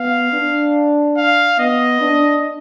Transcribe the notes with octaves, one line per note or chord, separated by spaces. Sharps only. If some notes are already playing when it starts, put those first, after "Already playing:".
Already playing: B3 F5
D4
F5
B3 D#5
D4